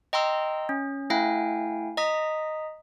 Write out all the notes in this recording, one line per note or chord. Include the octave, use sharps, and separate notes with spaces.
D#5 G5 A#5 C6 E6
C#4
A3 E4 F5 G5 G#5
D#5 A#5 D#6 B6